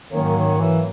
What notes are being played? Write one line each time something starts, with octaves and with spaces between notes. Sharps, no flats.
G#2 D#3 F#3 A#3 C#4
D#3
E3